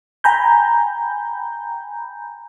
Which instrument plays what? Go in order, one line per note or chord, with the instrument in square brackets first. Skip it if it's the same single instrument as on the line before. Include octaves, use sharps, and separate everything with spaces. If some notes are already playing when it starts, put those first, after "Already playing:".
[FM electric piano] G5 G#5 A#5 B5 G6